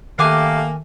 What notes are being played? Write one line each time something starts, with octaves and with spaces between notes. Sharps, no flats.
D#3 A3 A#3 G4 G#5 D6 F#6